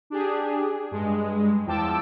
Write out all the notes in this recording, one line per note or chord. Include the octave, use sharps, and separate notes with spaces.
D4 G4 G#4
G2 G#3
E2 F3 G5 A5 D6 E6